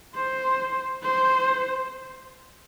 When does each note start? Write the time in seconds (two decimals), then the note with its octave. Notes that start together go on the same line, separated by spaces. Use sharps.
0.15 C5
1.03 C5